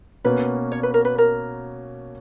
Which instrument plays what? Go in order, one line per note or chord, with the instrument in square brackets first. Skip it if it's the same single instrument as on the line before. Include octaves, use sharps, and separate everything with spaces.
[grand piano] B2 A#3 C#4 F#4 [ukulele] B4
[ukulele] C#5
B4
A#4
B4
A#4